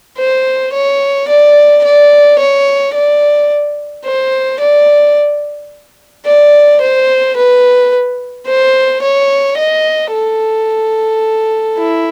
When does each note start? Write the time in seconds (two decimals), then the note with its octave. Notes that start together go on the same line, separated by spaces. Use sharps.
0.18 C5
0.73 C#5
1.28 D5
1.84 D5
2.39 C#5
2.94 D5
4.05 C5
4.60 D5
6.26 D5
6.81 C5
7.36 B4
8.47 C5
9.02 C#5
9.57 D#5
10.13 A4
11.78 E4